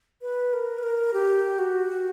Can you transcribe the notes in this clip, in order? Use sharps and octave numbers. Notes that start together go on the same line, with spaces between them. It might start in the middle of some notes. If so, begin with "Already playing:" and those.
B4
A#4
B4
A#4
G4
F#4